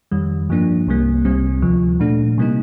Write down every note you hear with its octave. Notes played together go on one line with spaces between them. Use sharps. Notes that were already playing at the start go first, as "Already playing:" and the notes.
F2 D#3 G3
G2 F3 A#3 D4
C2 C3 G3 A#3
C2 C3 G3 C4
D2 C3 F3
A#2 A3 D4
C3 G3 A#3 D#4